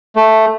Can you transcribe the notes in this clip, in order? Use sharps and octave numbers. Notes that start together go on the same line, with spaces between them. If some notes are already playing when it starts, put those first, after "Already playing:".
A3